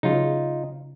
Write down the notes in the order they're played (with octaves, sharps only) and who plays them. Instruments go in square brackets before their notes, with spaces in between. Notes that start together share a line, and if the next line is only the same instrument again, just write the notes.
[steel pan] C#3 F#3 [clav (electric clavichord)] D#4 F4